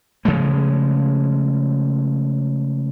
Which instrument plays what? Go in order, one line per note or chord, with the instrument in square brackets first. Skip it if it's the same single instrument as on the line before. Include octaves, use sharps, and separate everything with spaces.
[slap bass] C#3 F3 G#3 A3